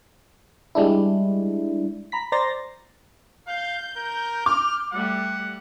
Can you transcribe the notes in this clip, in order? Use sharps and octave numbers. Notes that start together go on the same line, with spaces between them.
G3 G#3 D4 E4
A#5 B5 B6
C5 D5 A#5 C6 A6 A#6
F5 G6
A#4
D6 F6
G3 A3 F#5